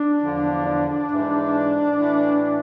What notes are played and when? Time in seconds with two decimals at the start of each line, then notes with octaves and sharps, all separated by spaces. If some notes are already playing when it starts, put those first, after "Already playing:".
Already playing: D4
0.21 E2 D3 F3
1.09 G#2 E3
1.95 A2 E3